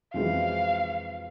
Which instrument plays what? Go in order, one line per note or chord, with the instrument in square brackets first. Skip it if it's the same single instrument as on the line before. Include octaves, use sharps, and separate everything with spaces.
[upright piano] F2 E3 G#3 C4 [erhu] F5